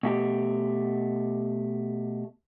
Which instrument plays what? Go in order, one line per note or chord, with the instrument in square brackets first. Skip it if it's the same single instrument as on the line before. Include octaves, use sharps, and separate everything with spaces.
[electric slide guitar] B2 A3 G4